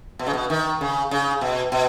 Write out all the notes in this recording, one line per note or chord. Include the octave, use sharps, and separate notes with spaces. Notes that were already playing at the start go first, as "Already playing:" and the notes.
B2
C#3
B2
D#3
C#3
C#3
B2
B2